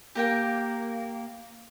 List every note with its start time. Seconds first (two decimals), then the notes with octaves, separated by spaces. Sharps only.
0.15 A#3 G4 A#4 G5